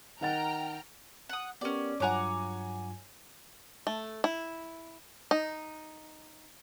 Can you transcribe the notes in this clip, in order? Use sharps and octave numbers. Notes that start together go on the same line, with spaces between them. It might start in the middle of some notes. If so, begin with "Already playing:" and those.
D#3 F#5 G5 A#5 F6 A6
F#5 D#6
B3 C#4 G4 A#4 D5
G2 F#3 F4 C#5 F#5 G#5 A#5 D6
A3
E4
D#4